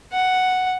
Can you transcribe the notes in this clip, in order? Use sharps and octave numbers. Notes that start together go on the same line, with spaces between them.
F#5